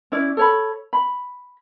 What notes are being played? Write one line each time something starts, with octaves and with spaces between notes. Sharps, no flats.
C#4 E4 D5
A4 C#5 B5
B5